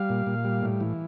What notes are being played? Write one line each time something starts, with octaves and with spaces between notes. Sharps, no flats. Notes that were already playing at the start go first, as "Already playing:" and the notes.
Already playing: G3 F5
A#2
A#2
G3
A2
E3